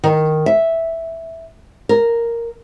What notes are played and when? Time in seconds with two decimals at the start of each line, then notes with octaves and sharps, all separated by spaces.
0.04 D#3
0.46 E5
1.89 A#4